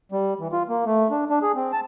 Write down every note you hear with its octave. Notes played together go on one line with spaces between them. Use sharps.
G3
E3
F4
A#3
A3
D4
D4
G#4
C4
A5